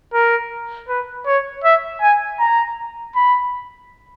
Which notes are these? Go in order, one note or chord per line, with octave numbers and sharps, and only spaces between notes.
A#4
B4
C#5
E5
G#5
A#5
B5